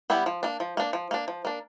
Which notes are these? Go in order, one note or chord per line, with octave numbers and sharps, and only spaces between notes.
G3 B3 E4 G4
F3
A#3 D4
F3
A#3 D4
F3
A#3 D4
F3
A#3 D4